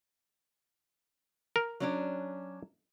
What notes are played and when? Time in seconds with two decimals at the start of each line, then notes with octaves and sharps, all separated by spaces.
1.56 A#4
1.80 F#3 C#4 D4